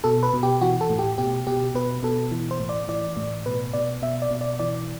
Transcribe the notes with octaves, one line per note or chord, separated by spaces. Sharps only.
B2 A4
B4
B2
G4
E3 F#4
A4
A2
G4
B2 G4
B2 G4
B2 B4
B2 A4
E3
C5
A2
D5
E3 D5
A2
B2 B4
B2 D5
B2 E5
D5
B2
D5
E3 D5